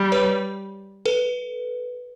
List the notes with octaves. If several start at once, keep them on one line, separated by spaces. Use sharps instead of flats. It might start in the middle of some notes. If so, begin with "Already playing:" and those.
Already playing: G3
B4 C#5
A4 B4